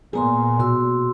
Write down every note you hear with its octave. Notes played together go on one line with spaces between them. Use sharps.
A#2 B3 G#4 G#5 A#5 C6
B2 F#4 C6 E6